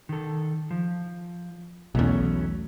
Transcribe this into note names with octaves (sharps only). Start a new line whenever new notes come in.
D#3 A4
F3
B1 E2 F#3 A3 C#4